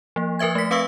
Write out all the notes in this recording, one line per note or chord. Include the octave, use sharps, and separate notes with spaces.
F3 A#3
F3 A#4 B4 E5 G#6
A3 B6
C4 B4 F5 C#6 E6